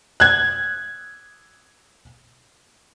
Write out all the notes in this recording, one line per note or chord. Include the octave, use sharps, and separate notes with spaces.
F#6 G#6